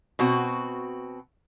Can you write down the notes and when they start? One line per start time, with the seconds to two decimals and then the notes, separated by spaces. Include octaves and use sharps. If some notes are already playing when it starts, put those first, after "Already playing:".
0.19 B2 C4 F#4